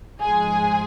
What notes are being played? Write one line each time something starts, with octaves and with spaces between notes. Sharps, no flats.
G#2 F3 G#3 G#4 G#5